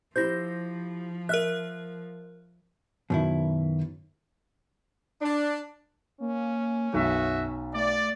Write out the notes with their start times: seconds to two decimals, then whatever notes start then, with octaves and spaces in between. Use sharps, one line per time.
0.16 F3 E4 G4 C5 G6 A#6
1.29 A#4 E5 F6 F#6
3.10 F#2 B2 D#3 E4
5.22 D4
6.20 A#3 C#4
6.94 B1 F#2 F#4 E5
7.74 A3 D5